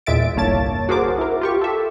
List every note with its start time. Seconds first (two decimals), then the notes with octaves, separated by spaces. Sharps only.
0.06 E2 A#2 G#3 E5 A6 D7
0.36 G1 C2 A#3 C#5 A5 A6
0.89 F#4 G#4 A#4 C5 D6
1.18 E4 A#4
1.41 F4 G4 C#6
1.61 A4 E5